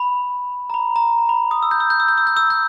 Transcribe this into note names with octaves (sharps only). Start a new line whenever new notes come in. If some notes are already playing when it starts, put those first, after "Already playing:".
Already playing: B5
A#5
B5
A#5
A#5
B5
D#6
E6
G6
E6
G6
E6
G6
E6
G6
E6
G6